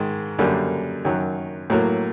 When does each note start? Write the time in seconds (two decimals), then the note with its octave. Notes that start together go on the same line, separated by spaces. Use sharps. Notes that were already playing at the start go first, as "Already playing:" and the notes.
Already playing: G#2 D#3 G#3
0.39 F#2 D3 G3 A#3
1.05 F#2 D#3 F#3
1.70 A2 F#3 A#3